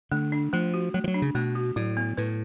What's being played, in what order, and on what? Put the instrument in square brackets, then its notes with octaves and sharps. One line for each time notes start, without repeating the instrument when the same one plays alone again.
[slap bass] D3 [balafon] A3
[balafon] D4
[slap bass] F3 [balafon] A3
[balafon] F#4
[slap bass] F#3 [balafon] A3
[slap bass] F3
F#3
[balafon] D4
[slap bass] C#3
[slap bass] B2 [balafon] A3
[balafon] F#4
[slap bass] A2 [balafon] F#3
[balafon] B3
[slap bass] A2 [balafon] B4